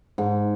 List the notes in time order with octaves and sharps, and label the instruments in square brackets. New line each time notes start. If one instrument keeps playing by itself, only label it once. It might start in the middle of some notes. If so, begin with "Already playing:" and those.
[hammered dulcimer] G#2